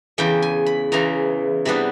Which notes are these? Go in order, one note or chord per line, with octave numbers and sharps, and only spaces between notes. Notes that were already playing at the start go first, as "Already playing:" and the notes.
E2 C#3 E3 G5
G#5
B5
E2 C#3 E3 A#5
C3 E3 G3 B3 D4 B5